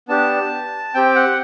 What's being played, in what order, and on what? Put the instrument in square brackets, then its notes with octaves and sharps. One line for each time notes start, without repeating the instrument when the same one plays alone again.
[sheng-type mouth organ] B3 D4 G4 A5
C4 G4 G5
F#5